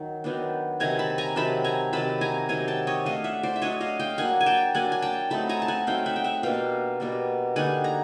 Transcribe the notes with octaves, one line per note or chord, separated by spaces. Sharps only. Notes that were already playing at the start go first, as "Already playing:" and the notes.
Already playing: D#3 F#3
D#3 F#3 B3 D4
C3 D#3 F#3 G#5 A#5
A5 B5
G#5 A#5
C3 D#3 F#3 A5 B5
G#5 A#5
C3 D#3 F#3 A5 B5
G#5 A#5
C3 D#3 F#3 G#5 A#5
G5 A5
C#5 D#5
F#3 A3 D4 D#5 F5
E5 F#5
C5 D5
E5
F#3 A3 D4 C#5 D#5
D#5 F5
F5 G5
F#3 A#3 D4 F#5 G#5
G#5
G5 A5
F#3 A#3 D4 F#5 G#5
G#5
G5 A5
F#3 A3 C4 D#4 A5 B5
G#5 A#5
A5
F#5 G#5
F#3 A3 C4 D#4 F5 G5
E5 F#5
G5
E5 F#5
B2 G3 A#3 D4 F5 G5
B2 G3 A#3 D4
D3 G3 A#3 D#4 F#5 G#5
A#5